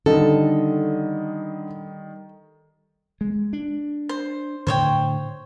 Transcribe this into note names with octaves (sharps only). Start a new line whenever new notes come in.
D3 D#3 G3 A4 D#5
G#3
D4
C5
A2 D3 C5 C#5 G5